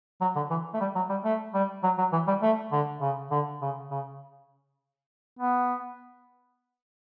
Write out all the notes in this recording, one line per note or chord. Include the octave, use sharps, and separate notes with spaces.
F#3
D3
E3
A3
G3
F#3
G3
A3
G3
F#3
F#3
E3
G3
A3
D3
C#3
D3
C#3
C#3
B3